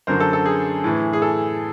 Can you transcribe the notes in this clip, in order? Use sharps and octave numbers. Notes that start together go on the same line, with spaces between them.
F#2 D3 F#3 A#4 C5
A4
A4
G#4
A2 E3
G#4
A4